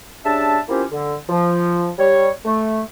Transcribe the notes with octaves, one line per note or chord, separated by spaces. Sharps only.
C#3 G3 D4 E5 A5
A#3 C4 C#4 E4 F4 G4
D3
F3
G3 C#5
A3